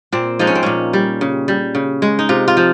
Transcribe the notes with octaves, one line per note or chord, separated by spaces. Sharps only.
A#2 C4
F3 G#3 D#4
C#4
C4
A#2 C#4
G3
C#3
G3
C#3
G#3
D#4
C3 F4
F4
F3